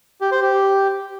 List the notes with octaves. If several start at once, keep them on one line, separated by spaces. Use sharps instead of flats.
G4
C5
G4